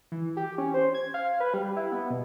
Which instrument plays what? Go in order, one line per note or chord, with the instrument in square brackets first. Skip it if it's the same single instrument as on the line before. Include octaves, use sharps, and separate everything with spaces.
[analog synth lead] E3
G4
C#4
C5
G#6
F5
B4
G3
E4
B3
B2